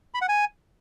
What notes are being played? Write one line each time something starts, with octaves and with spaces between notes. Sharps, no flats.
B5
F#5
G#5